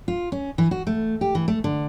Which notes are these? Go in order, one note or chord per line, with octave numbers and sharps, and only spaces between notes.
F4
C#4
E3
F#4
A3
G4
E3
A3
D3